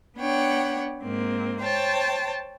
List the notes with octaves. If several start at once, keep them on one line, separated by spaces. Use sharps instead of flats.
B3 D4 C#5 F#5 G5
G#2 A#3 C4
C5 C#5 G5 A5